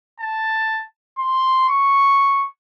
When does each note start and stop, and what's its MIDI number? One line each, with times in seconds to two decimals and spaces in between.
0.20 0.83 81
1.19 1.69 84
1.69 2.47 85